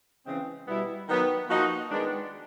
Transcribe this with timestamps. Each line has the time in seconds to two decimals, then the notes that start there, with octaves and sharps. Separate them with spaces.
0.26 C#3 E3 G#3 C4
0.67 B2 G3 B3 E4
1.07 D#3 F#3 B3
1.49 F3 A#3 D#4 F#4
1.91 D#3 G#3 B3 D4